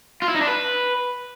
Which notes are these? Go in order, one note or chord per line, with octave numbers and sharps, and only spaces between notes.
F4
E4
D#4
D4
B4